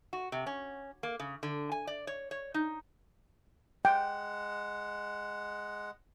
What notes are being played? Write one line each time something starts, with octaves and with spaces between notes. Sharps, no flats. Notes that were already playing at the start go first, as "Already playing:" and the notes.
F#4
C3
C#4
A#3
C#3
D3
G#5
D5
C#5
C#5
D#4
G#3 F#5 G5